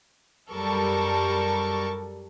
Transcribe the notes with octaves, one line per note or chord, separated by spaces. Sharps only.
F#2 G3 A4 A#4 A5 C#6